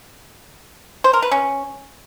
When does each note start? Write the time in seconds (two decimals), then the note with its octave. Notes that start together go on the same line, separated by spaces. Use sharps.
1.04 C5
1.13 A#4
1.22 B4
1.32 C#4